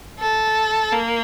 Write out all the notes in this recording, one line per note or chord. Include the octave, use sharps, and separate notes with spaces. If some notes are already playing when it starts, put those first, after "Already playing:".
A4
A#3